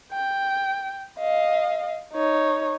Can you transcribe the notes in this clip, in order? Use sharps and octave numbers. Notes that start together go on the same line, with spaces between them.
G5
D#5 F5
D#4 C#5